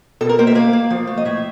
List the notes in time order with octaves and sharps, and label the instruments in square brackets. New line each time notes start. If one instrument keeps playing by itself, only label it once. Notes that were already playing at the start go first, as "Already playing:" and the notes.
[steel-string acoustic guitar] B2 A4
A#4
A#3 C5
E5
A#3 F5
A#3
F3
A3
D#5
A2 E5